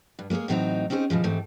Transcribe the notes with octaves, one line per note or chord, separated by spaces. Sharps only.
G2
G#3 A#3 F#4 G#4 C#5
A2 E3 F#3 C4 D#4 A#5
C4 C#4 D#4 G#4 C5
B2 E3 F3 G#3
G#2 E3 A3 C4 G4